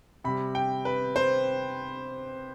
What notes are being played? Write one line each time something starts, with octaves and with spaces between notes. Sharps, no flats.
C3 G3 B5
G5
B4
C5